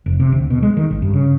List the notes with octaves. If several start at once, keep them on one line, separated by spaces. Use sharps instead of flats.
F1
C3
D2
B2
G#3
D#3
G#1
G2
C#3